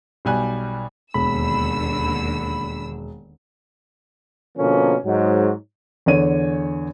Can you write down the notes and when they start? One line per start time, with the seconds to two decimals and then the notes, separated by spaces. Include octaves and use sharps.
0.25 B1 B2 G3 G#5 F#6
1.14 E1 D#2 D3 B5 E6
4.58 B2 D3 F3 A#3 C#4
5.05 G#2 F#3
6.06 E2 D3 C#5 D#7